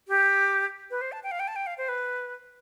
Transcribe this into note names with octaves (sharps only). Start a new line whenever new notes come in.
G4
B4
C5
A5
G5
F5
G5
A5
G5
F5
C5
B4